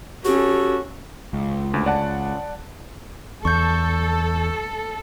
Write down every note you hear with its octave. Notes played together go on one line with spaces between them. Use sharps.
C#4 F#4 G4 A4
C#2
D2
D5 F#5 A5
E2 A4 C#6 G6